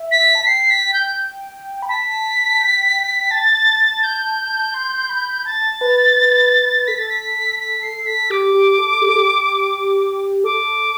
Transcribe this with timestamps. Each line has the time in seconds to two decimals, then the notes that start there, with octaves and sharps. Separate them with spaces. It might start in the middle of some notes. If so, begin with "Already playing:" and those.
Already playing: E5
0.11 B6
0.35 A5
0.46 G5 C7
0.70 B6
0.94 G6
1.82 B5
1.89 A5 B6
2.60 G5
3.31 A5 A6
4.04 G6
4.74 C6
5.09 B5
5.45 A5 A6
5.81 B4
6.17 B4
6.88 A4 B6
6.99 A6
7.09 B6
7.60 B6
7.83 C7
8.06 B6
8.30 G4 D6
8.54 G4
8.79 A4
9.02 G4
9.08 A4
9.16 G4
10.44 A4 D6